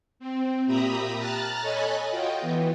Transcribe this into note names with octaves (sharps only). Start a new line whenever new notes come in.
C4
A#2 G4 E5 A#5 B5 D#6
A5 A#5 F6 F#6 A6
A4 C#5 D#5 G#5 B5 F#6
F4 F#4 D#5 G5
E3 B3